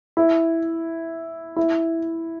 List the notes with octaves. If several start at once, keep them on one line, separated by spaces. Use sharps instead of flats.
E4
E4